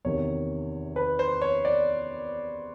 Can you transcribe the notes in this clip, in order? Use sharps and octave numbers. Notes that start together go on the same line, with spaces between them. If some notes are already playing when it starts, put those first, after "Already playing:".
E2 C3 D#3 C#5
B4
C5
C#5
D5